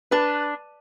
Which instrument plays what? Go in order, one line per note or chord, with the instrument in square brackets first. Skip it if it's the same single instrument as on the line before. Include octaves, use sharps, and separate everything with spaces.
[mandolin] D4 [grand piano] B4